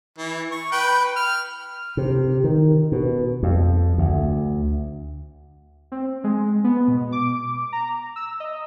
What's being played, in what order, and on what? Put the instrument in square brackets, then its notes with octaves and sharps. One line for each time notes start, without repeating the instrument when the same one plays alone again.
[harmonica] E3
C#6
B4 G5
F6
[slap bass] C3
D#3
B2
F2
D2
[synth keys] C4
G#3
B3
B2
D6
A#5
E6
D#5